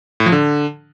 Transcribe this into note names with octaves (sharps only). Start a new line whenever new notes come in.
A2
F3
D3